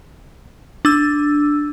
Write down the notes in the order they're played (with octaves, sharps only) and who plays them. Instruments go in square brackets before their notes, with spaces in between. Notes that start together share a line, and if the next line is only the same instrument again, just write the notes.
[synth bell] D4 E6